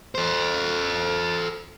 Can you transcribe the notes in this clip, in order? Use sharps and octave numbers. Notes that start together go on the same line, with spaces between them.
A4 C5